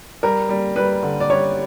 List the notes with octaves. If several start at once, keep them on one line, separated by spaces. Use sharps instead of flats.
G3 A#4
G3
G3 B4
D3
D5
G3 C#5